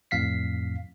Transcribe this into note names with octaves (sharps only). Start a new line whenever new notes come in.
F2 A2 F5 B6 C7